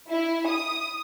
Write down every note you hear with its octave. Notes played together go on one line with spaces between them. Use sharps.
E4
D#6